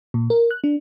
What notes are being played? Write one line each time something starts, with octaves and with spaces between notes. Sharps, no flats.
A#2
A#4
F#6
D4